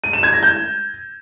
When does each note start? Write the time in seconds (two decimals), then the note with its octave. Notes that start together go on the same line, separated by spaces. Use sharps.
0.04 D#7
0.13 E7
0.23 G#6
0.33 A#6
0.43 G6